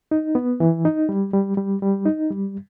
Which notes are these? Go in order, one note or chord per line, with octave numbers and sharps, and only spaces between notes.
D#4
B3
E3
D#4
G3
G3
G3
G3
D#4
G3